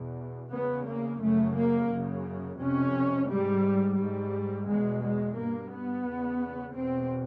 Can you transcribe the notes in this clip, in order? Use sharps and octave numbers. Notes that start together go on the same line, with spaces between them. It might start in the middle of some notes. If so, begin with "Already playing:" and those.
Already playing: E2 B2
E2 C#3 B3
A#3
F#2 C#3 A3
A#3
F#2 C#3
F2 C3 C#4
G#2 G3
G#2 G3
E2 B2 G#3
G#3
G2 A#3
B3
E2 C#3
E2 B2 C4